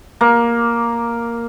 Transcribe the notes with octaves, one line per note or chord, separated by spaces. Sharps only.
A#3